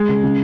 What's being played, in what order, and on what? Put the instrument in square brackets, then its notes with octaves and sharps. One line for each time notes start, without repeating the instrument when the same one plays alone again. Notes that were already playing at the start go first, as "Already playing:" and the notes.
Already playing: [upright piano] G#3
[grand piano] C#3
C#3